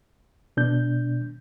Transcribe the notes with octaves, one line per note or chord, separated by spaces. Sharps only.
B2 D4 G6